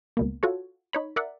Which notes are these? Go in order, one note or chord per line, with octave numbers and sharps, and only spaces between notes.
C#2 B2 A#3
F4 F#4 A4 C#5
D#4 C#5 B5
A#4 D5 E5 F#5